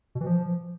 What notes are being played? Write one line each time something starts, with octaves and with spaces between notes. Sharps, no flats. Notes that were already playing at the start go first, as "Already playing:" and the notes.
B2
E3
F3